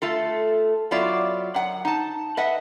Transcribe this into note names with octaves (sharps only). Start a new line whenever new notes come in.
A3 F4 A4
F#3 B3 E4 F4 D5
F#2 F#5
D#4 A5
B4 D#5 E5 F#5